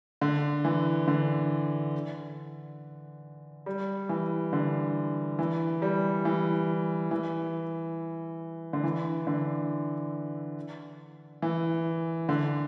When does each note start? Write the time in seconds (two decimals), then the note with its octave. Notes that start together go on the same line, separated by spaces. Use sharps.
0.21 D3
0.65 E3
1.08 D3
3.66 G3
4.09 E3
4.53 D3
5.39 E3
5.82 G3
6.25 E3
7.11 E3
8.73 D3
8.84 E3
9.27 D3
11.42 E3
12.29 D3